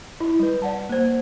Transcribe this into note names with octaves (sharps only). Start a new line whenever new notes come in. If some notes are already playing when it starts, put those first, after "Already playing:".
E4
G3 B4
D5 F#5 A5
A#3 C5